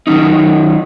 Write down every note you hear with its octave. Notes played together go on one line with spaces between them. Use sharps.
D#3 F#3 C#4 D#4